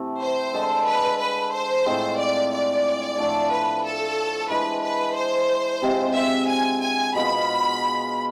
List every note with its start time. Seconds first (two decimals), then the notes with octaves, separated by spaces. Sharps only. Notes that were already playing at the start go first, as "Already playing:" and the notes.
Already playing: C3 E3 A3 C4
0.20 C5
0.53 D3 G#3 D4 A4
0.86 B4
1.20 B4
1.53 C5
1.86 A2 G#3 C4 F4
2.19 D5
2.51 D5
3.18 A2 F3 A3 D4
3.51 B4
3.84 A4
4.50 E3 G#3 D4 B4
4.83 B4
5.16 C5
5.82 C3 G#3 C4 F4
6.15 E5
6.49 G#5
6.81 G#5
7.15 B2 G#3 B3 F4 B5